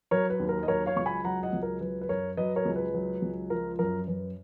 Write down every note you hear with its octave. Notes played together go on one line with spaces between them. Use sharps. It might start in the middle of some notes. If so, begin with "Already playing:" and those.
F#3 A#4 C#5
B4
D#2
A#4
D#5
F#3 A#4 C#5
C#5 F5
C#2 C#6
G#5 B5
F#3 F#5 A#5
D#5 F#5
C#2
A#4
F#3 B4
B4
F#2 A#4 C#5
F#3 B4 D#5
A#4 C#5
C#2
B4
F#3
C#2
F3 A#4
F#2 A#4
F#2 B4